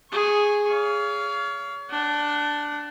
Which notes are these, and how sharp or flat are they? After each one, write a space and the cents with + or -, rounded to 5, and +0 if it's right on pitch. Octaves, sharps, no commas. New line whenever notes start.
G#4 +0 C#6 -15
C#5 +35 F5 -5
D4 +0 F#5 +40